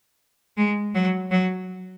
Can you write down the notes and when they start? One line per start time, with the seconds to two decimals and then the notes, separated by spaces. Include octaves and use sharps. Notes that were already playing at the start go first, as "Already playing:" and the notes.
0.57 G#3
0.95 F#3
1.31 F#3